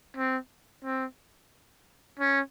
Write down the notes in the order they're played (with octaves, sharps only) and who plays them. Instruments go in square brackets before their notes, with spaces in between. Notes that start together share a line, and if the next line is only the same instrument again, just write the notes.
[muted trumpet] C4
C4
C#4